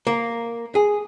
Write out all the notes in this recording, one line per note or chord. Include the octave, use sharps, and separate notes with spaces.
A#3
G#4